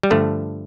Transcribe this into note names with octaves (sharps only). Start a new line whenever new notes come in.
G3
G2 D3 F3 A3